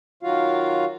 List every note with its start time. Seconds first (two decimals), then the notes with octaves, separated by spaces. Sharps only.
0.23 D#3 F#3 F4 F#4 F5